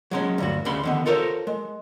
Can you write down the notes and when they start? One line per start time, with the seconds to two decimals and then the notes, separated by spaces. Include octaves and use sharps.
0.11 F#3 G#3 C#4
0.38 D2 G2 F#4
0.65 D2 C#3 B5 C6
0.84 D3 D#3 B3
1.06 F4 A4 A#4 C5 C#5
1.47 G#3